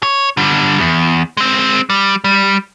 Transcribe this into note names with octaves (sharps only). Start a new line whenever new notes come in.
C#5
D3 G3
E2
G#3 C4
G3
G3